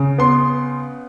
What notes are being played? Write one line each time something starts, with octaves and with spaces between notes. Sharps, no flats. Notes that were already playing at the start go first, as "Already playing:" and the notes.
Already playing: C#3
B3 C6